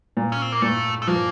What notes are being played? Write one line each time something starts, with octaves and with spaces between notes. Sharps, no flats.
A#2
C#4
C4
A#3
A#2 A3
A3
F3 A#3